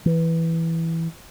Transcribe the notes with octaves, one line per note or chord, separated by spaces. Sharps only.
E3